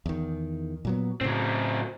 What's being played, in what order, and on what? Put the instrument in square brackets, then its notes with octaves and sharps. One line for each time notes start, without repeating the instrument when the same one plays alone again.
[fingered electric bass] E2 D#3
A#2 F#3 B3
[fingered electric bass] A2 C#3 [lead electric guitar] F#3 C4